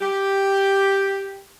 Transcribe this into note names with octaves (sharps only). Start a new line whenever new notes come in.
G4